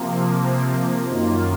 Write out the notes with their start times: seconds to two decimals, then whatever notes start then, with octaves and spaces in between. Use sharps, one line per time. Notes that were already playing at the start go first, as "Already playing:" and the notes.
Already playing: C3 F3 A#3
1.08 F#2 D#3 A#3 F4